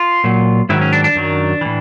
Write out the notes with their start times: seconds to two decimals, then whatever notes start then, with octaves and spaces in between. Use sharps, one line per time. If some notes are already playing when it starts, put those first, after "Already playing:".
Already playing: F4
0.24 A#2 F#3
0.69 G#2 D#3 F#3 E4
0.81 C#4
0.93 D4
1.04 D4
1.15 F#2 D#3 F#3
1.61 A2 E3